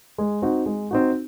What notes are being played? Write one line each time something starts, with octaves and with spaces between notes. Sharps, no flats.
G#3
C4 D#4 F#4
G#3
C4 D#4 F#4